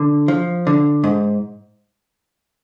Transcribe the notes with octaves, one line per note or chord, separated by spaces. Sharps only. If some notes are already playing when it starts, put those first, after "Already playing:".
Already playing: D3
F3
D3
G#2